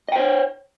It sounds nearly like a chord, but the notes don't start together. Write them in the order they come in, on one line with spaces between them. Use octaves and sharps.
D#5 G5 C5 C#5